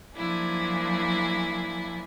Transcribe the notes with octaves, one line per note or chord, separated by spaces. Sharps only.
F3 F#3 A#3 D4 E4 G#4